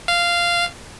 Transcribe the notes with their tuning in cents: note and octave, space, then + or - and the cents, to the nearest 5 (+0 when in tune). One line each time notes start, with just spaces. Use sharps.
F5 -10